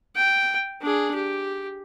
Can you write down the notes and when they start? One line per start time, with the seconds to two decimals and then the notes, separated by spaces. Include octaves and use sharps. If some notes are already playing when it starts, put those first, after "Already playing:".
0.15 G5
0.82 D4 G#4
1.14 G4